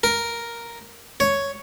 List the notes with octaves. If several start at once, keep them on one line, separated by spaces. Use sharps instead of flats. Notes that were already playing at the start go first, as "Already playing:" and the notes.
A#4
C#5